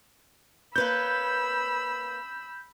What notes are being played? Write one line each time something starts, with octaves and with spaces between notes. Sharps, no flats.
A#3 B4 C#5 B5 E6 G6